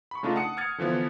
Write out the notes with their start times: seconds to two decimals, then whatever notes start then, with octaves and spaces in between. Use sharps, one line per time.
0.11 B5 C#6
0.23 C#3 A3 D4 D#4 F4
0.36 F#5 A5 D#6 C#7
0.57 D#6 F6 G#6 A6 C#7
0.78 D3 E3 F3 B3